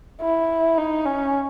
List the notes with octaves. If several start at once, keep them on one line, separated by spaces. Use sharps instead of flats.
E4
D#4
C#4